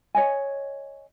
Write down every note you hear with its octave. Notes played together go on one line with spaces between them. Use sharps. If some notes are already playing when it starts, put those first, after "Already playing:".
C#5 D#5 G#5